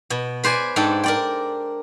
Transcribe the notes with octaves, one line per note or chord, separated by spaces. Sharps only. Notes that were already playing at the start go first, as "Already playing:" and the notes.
B2
B4 C5 D5 G#5
G#2 D4 A4 G5
A#4 D5 G5